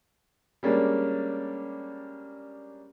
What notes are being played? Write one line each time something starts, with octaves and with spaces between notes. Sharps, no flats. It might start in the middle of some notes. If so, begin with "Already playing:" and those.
G3 G#3 A#3 C#4 D4